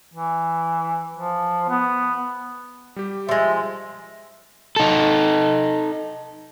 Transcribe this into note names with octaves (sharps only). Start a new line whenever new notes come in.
E3
F3
B3
G3 G4
F3 G#3 E5
D#4 A4